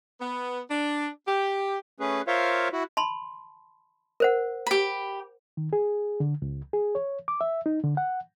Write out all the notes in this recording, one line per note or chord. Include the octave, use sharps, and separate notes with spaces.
B3
D4
G4
A3 C#4 G#4 B4
F4 A#4 C5 C#5 E5 F5
E4 F#4
A5 B5 C6
A#4 C5 F#5
G4 B5
D#3
G#4
D3
C#2
G#4
C#5
D6
E5
D#4
D3
F#5